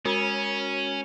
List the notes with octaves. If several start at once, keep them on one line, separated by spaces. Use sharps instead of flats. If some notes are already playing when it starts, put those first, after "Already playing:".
G#3 C#4 F#4 A#4